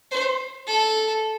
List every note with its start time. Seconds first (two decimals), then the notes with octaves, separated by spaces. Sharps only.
0.11 C5
0.67 A4